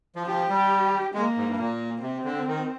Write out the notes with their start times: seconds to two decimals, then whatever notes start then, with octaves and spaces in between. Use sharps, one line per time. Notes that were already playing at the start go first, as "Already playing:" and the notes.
0.16 F3
0.27 F3 G4
0.49 G3
1.14 G#3 A#3
1.37 G#2
1.48 G2
1.58 A#2 A#3
2.02 C3 C4
2.25 D3
2.47 D#3